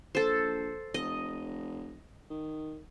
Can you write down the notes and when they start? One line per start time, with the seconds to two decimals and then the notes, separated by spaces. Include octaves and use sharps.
0.15 A#1 A4 C5
0.94 F1 D#5
2.30 D#3